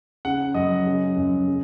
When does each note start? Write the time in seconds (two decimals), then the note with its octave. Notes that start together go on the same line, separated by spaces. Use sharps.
0.25 C#3 F#5
0.54 F#2 D#5
0.86 C#3
1.17 F#2
1.47 C#3